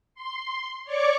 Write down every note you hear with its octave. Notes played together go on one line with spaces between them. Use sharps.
C6
C#5 D5 C#6 D6